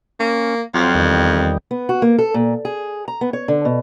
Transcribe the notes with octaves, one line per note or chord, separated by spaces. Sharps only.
A#3 C#4
F2 F#3 C4 F4
E2 D#3 G3
B3
F#4
A#3
A4
A#2
G#4
A#5
B3
C#5
D3
B2